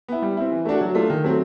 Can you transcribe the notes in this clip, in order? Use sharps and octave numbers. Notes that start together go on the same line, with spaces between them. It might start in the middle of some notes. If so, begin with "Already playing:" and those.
B3 E4
G3
C4 E4
E3
A3 D4 F#4
F#3
A3 D4 F4
D#3
F#3 A3 C4